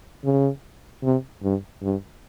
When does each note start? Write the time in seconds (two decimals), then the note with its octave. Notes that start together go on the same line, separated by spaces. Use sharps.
0.24 C#3
1.03 C3
1.43 G2
1.82 G2